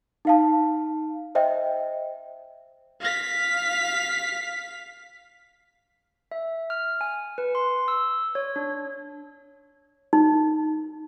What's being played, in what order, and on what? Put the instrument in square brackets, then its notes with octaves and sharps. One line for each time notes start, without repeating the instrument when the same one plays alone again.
[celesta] D#4 F5 A5
C5 D#5 E5 G5
[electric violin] F5 B6
[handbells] E5
F6
G#5
B4
C6
E6
C#5
D4
[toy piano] D#4